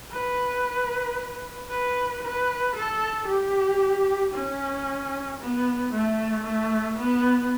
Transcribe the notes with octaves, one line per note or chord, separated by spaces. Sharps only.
B4
B4
B4
A4
G4
C#4
B3
A3
A3
B3